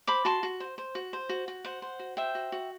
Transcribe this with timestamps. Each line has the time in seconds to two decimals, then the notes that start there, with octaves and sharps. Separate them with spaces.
0.07 C5 B5 D6
0.25 F#4 A5 C6
0.43 F#4
0.60 C5
0.78 C5
0.95 F#4
1.13 C5
1.29 F#4
1.48 F#4
1.65 C5 F#5
1.82 C5
1.99 F#4
2.17 C5 E5 G5
2.35 F#4
2.52 F#4